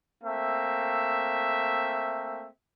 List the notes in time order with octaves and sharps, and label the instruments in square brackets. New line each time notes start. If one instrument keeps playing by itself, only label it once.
[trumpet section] A3 A#3 C4 E5